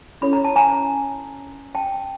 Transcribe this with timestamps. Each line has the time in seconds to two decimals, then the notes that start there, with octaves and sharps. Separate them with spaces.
0.21 C#4 E4 A4 C#5 B5
0.33 A#5
0.45 A5
0.56 G#5 A#5
1.75 G5 A5